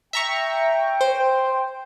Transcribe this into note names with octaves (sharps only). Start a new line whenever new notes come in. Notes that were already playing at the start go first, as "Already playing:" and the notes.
E5 G5 A#5 C#6
C5